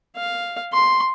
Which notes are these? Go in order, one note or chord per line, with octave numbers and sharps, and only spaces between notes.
F5
C6